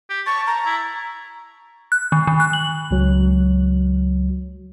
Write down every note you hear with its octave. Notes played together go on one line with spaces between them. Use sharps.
G4
A5 C#6
A#5
E4
F#6
D#3
D#3
F#6
F#7
C#2 F#3